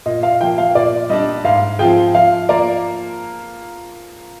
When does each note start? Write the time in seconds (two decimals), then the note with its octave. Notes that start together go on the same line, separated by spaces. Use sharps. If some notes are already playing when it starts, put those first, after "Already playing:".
0.06 A#2 D#5
0.23 F5
0.40 F3 A#3 G5
0.58 F5
0.75 A#2 D5
1.09 G3 D4 D#5
1.44 G#2 F5
1.79 F3 C4 F4 G#4 G5
2.14 F3 F5
2.49 A#3 F4 A#4 D5